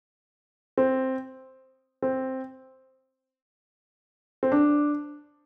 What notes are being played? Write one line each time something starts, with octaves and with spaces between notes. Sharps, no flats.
C4
C4
C4
D4